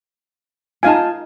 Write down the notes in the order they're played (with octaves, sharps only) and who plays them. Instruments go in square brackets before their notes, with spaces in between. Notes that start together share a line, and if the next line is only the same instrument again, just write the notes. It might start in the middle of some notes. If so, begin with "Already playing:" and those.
[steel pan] D#4 F5 G#5 [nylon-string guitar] F4 D#5 A5